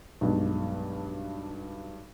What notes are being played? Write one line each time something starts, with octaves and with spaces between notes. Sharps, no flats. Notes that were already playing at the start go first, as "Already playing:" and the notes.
B1 G2 G#3